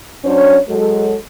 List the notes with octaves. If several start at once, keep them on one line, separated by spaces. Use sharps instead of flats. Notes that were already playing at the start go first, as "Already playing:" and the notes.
F#3 C#4 D4 C5 C#5
F#3 G#3 A4